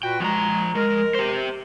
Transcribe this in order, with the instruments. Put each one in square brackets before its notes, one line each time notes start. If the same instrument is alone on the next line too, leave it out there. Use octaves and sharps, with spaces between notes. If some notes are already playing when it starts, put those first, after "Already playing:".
[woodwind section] A#2 F#4 B4 [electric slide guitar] G5
[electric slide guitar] F3 G5 A#5 [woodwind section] G#3
[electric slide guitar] G#3 [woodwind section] A#4
[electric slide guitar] G4 C5